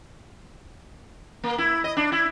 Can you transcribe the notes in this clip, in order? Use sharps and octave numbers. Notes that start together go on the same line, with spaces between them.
A#3
E4
D#5
D4
E4